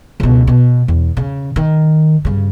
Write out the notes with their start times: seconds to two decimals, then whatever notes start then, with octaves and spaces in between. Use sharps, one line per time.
0.20 C#2 B2
0.47 B2
0.88 E2
1.17 C#3
1.56 D#3
2.25 G2 C#3